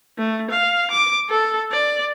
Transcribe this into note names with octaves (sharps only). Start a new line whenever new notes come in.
A3
F5
D6
A4
D5